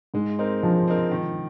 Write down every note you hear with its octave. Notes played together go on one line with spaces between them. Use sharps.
G#2 G#3
C4 D#4 A#4
F3 G#3
C4 D#4 A#4
D#3